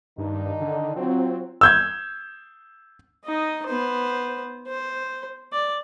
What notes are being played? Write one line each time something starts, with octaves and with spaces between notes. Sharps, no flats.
G2 D#3 D4 D#4
D3
F#3 C4 F4
E6 G6 G#6
D#4 D#5
B3 C5
C5
D5